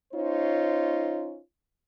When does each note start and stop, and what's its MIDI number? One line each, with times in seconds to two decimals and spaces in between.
0.13 1.39 61
0.13 1.39 63
0.13 1.39 65
0.13 1.39 72
0.13 1.39 73